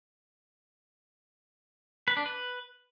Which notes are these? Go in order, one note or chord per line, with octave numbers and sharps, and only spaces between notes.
B4
D4
B4